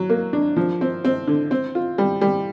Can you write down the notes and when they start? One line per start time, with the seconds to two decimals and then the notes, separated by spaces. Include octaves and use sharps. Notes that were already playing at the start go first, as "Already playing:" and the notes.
Already playing: F#3
0.10 A#3
0.33 D4
0.56 F3
0.81 C4
1.05 C4
1.28 D3
1.51 C4
1.75 F4
1.98 G3
2.21 G3